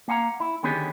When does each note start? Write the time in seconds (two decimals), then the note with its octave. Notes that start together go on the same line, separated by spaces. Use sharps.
0.08 A#3 F5 F#5 G#5 A#5
0.40 E4
0.63 D3 D#3 B3 C#4 G4 G#4